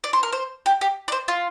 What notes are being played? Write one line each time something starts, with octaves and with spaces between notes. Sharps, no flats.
D5
C5
A#4
C5
G4
G4
D5
C5
F4